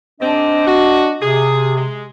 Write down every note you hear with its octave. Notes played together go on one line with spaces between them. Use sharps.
G#2 C4 D4 D#5
F#4
C3 G#4
G#3